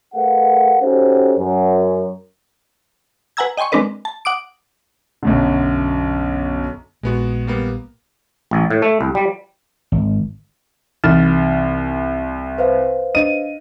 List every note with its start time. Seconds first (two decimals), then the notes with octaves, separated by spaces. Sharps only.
0.14 A3 G#4 A#4 B4 F5 F#5
0.81 C#4 D#4 F#4 G4 A4 C5
1.38 F#2
3.37 B4 F#5 G#5 A#5 E6 G#6
3.57 D#5 G5 G#5 C6 C#6
3.72 G#3 C4 D4 A#4 B4 D#5
4.05 A5
4.25 F#5 D6 D#6 D7
5.23 B1 F#2 D3
7.03 A#1 G#3 B3 F#4
7.47 G3 A#3 B3
8.51 A1
8.70 A2
8.82 A3
9.01 C2
9.15 G3
9.92 G#1
11.04 C2 E3 D#4 F6 A6 E7
12.58 B4 C5 F5
13.15 D4 D#5 D#7